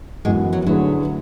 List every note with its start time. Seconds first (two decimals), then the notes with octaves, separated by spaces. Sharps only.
0.25 F#2 E3 G#3 B3 F#4
0.53 F#3
0.66 D3 F#3 A3 E4 G#4 B4